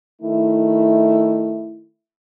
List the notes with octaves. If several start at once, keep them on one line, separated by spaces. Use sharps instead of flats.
D#3 A3 E4